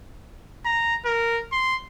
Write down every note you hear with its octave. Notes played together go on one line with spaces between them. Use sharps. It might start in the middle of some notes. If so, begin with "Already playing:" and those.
A#5
A#4
C6